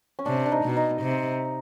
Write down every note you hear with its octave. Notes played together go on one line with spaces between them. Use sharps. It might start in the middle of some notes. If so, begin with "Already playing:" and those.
C#4
C3 D4
D4
D#4
B2
D#4
C3